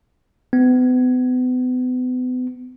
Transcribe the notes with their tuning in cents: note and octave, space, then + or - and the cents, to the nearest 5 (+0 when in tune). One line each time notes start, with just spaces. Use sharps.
B3 +35